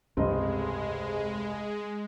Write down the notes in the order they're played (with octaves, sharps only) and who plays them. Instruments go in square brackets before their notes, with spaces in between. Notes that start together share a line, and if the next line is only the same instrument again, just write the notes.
[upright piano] F1 D#5 [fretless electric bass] C#2 G2 [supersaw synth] G#3 [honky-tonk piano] C4